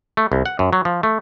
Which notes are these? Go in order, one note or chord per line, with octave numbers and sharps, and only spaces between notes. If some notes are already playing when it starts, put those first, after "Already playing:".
A3
C2
F#5
F#2
F#3
F3
A3